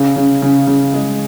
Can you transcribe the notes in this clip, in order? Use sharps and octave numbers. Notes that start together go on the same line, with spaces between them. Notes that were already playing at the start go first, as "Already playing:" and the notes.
Already playing: C#3
C#3
C#3
C#3
G#3